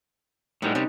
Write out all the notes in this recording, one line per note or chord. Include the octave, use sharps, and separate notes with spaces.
A2 G3 G#3 B3 D#4 B4
C3 G3 C#4 D#5